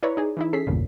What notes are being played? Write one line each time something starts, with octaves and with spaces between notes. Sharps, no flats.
E4 B4 C#5 D5 A#5
D#4 G#4 D5
E3 D#4 E4
C#4 G#4 A4 B6 C7
A1 E2 G2 A#2 C#3